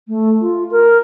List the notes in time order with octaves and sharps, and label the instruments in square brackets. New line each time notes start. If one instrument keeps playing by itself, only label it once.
[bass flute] A3
F4
A#4